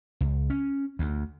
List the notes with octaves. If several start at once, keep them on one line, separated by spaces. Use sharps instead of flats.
C#2
C#4
D2